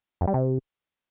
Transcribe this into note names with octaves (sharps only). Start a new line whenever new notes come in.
F2
G3
C3